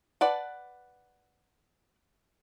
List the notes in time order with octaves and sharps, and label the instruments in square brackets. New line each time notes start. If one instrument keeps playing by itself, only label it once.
[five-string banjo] B4 D5 F#5 A5